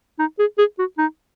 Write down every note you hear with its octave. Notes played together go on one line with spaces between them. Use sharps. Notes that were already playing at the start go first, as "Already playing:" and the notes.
D#4
G#4
G#4
F#4
D#4